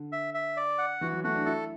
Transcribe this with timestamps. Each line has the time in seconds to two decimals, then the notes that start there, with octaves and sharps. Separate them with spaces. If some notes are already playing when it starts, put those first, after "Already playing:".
Already playing: D3
0.12 E5
0.34 E5
0.57 D5
0.78 F#5
1.01 E3 F#4
1.12 F#3
1.24 A3 F#4
1.35 D4
1.45 E4 A4